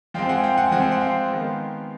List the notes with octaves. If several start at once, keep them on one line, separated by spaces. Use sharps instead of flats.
F3 G#3 C4 F5 G5
F#5 G#5
F5 G5
F#5 G#5
F3 G#3 C4 F#5 G#5
F#5
F5 G5
D#3 G#3 B3